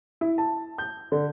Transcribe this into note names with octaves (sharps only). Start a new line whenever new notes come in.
E4
A5
G6
D3